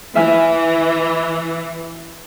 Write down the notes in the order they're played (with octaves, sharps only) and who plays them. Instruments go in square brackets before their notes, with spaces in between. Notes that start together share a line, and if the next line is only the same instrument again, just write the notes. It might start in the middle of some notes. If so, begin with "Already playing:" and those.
[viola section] E3 [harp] E5 G#5 F6